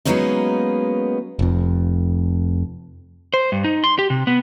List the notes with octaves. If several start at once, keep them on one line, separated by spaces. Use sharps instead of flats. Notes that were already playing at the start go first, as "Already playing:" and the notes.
F#3 G#3 A#3 B3 C#4 D#4
F1 F2
C5
G2
D#4
C6
G4
C3
B3